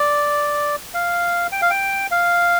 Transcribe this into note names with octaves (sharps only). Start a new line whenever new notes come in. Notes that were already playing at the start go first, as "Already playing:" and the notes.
Already playing: D5
F5
G5
F5
G5
F5